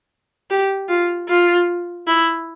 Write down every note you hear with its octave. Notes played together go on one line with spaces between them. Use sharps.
G4
F4
F4
E4